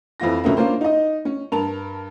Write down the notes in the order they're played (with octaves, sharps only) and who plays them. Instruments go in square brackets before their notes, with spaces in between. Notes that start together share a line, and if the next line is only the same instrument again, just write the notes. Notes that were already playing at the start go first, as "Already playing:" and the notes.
[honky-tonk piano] F2 E3 E4 F4 A#6
C#2 B2 D3 C#4 A#4 E5
A#3 C#4 D4 F4 A#4 C5
D#4 D#5
C#4
G2 A#4 A5 F7